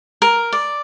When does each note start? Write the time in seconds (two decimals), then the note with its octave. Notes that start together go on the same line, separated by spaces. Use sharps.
0.22 A#4
0.53 D5